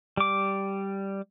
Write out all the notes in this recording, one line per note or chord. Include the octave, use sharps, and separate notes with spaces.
G3 D6